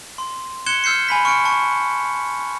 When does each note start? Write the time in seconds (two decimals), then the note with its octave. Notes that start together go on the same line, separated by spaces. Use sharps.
0.18 C6
0.66 C6 F#6 G#6 C#7 E7 G7
0.84 E6 F6 G6 C7 C#7
1.09 G#5 B5 B6
1.25 C#6 F6 C#7 D7
1.45 A5 C#6